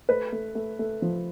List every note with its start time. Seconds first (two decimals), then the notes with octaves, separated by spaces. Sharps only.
0.09 A3 B4
0.32 A3
0.55 A3
0.79 A3
1.02 F3